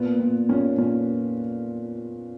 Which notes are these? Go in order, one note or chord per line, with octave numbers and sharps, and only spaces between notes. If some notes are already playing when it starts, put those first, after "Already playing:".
Already playing: A#2 B3
A#2
A#2 C#4
A#2 C#4